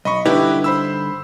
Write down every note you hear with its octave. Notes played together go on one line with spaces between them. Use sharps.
B1 D#5 B5 C#6
G2 D3 D#4 E4 G4 B4
C5 B5 E6